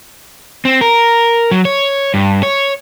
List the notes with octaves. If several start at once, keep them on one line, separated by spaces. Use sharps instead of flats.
C4
A#4
F#3
C#5
G2
C#5